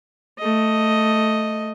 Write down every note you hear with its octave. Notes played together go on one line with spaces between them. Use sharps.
A3 D#5